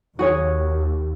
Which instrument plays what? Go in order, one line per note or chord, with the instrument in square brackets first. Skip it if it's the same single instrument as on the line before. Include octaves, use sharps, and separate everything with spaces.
[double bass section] D#2 [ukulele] F#4 G#4 C#5